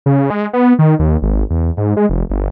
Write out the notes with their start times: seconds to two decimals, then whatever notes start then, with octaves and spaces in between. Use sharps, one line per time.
0.06 C#3
0.30 G#3
0.53 B3
0.79 D#3
0.99 D#2
1.22 G#1
1.50 E2
1.77 G#2
1.97 G#3
2.09 F1
2.30 G1